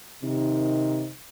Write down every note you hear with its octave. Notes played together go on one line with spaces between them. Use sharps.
C3 D#3 D#4